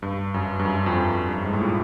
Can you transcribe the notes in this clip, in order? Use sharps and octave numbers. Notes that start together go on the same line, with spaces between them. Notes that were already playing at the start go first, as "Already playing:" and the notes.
G2
F#2
G2
F#2
F2
F#2
G2
G#2
A2
A#2